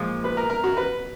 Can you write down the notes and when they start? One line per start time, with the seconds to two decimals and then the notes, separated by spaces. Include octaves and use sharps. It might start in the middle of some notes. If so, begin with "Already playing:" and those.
Already playing: A#2 F3 G#3
0.24 B4
0.37 A#4
0.50 A#4
0.64 F#4
0.77 B4